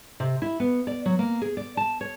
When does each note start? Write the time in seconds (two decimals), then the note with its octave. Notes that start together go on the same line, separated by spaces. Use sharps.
0.20 C3
0.42 E4
0.60 B3
0.87 D5
1.06 F#3
1.19 A#3
1.42 G#4
1.57 D5
1.77 A5
2.01 C#5